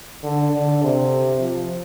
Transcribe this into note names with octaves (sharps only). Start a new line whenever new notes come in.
D3
D3
C3
F3